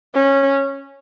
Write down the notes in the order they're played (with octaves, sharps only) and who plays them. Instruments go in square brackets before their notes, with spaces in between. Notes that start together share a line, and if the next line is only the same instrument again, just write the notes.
[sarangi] C#4